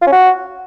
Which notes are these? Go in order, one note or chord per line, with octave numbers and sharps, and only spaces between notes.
F4
C#4
F#4